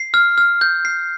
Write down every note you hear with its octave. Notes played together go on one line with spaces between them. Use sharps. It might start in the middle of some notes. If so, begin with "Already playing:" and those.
Already playing: C7
F6
F6
G6
C7